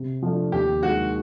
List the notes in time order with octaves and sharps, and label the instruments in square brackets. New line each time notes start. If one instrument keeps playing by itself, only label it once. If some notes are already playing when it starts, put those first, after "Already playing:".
Already playing: [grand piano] C3
F3 A3 D4
[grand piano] D#2 [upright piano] G4
[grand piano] D#3 G#3 [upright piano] F#4